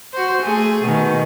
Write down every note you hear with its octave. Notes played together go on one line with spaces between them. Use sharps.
F#4 C5
A3 G#4
B2 D#3